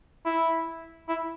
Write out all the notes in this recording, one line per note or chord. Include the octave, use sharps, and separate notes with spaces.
E4
E4